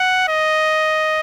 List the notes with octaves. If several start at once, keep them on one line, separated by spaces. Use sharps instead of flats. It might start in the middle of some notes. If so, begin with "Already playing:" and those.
Already playing: F#5
D#5